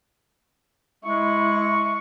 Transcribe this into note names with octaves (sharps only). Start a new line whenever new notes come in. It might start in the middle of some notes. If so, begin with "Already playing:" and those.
G#3 E4 C#6